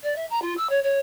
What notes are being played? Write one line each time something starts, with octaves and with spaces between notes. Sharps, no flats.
D5
E5
A#5
F4
E6
C#5
C#5